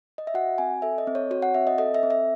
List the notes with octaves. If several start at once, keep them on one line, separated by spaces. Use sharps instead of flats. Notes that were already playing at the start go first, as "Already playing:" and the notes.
D#5
E5
F#4 F#5
C4 G#5
A4 E5
D#5
C4
C#5
F#4 C#5
F#5
C4 E5
D#5
A4 D#5
E5
C4
E5